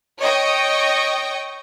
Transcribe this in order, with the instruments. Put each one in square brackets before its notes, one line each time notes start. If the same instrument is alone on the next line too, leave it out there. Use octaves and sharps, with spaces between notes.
[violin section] C#5 D#5 G5 C#6